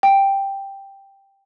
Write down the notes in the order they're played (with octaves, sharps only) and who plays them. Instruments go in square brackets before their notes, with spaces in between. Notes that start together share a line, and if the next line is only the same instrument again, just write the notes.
[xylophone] G5